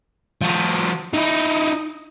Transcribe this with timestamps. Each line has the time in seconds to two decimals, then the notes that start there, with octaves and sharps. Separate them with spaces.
0.41 F3 F#4
1.14 D#4 E4